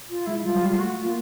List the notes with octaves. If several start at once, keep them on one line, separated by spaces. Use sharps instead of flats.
F4
G#3 E4
E4
G3 F4
F#3
G3
G#3 F4
A3 F#4
A#3 F4